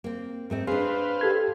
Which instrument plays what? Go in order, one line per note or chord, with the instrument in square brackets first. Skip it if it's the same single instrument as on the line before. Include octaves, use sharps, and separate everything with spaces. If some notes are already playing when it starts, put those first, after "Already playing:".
[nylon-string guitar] A#3 C4
G#2 A3 C4
[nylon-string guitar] D4 G#4 [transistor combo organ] B4 C5 F5
[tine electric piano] G4 A4 G#6